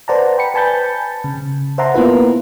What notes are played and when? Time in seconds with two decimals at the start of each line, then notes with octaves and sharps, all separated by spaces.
0.08 B4 C5 D5 F#5 A5 A#5
0.38 G5 B5 C#7
0.54 B4 G#5 A5 B5 G6 A6
1.24 C#3
1.78 C5 E5 F#5 A5 A#5 C6
1.94 A#3 B3 E4 F4 B4